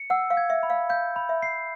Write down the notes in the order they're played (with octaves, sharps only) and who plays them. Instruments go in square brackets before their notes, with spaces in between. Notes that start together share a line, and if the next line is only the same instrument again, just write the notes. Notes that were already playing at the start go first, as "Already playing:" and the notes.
Already playing: [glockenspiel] C#7
[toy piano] F#5 [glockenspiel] E6
[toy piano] F5
[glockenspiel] G#6
[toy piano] E5
[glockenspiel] B5
[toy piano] F5
[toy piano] F5 [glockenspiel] G6
[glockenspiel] B5
[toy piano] E5
[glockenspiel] C7